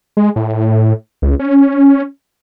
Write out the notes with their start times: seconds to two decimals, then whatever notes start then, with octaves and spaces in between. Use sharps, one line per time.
0.17 G#3
0.36 A2
1.22 C#2
1.39 C#4